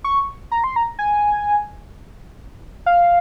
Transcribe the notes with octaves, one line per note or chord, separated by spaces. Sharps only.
C#6
A#5
C6
A#5
G#5
F5